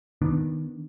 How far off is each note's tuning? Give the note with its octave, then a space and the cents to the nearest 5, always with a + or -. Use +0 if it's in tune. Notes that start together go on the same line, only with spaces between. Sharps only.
D#3 +0 B3 +0 D4 +0